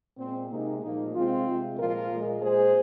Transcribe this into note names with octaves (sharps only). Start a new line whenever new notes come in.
A#2 G#3 C4
C3 G#3 A#3 D#4
A#2 F3 G#3 A#3 D#4
C3 G#3 C4 F4
C3 G#3
A#2 F3 G#3 F4 A#4
A#2 G#3
A#2 G#3 G#4 C5